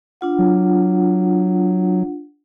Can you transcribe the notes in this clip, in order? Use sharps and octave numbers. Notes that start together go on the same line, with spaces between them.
D4 F4 F#5
F#3